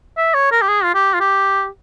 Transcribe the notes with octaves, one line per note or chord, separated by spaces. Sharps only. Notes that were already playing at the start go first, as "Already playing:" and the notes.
E5
C#5
A#4
G4
G#4
F4
G4
F4
G4